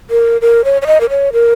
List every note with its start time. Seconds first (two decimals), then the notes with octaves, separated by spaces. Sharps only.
0.10 A#4
0.41 A#4
0.65 C#5
0.82 C#5
0.87 D#5
1.01 A#4
1.10 C#5
1.33 A#4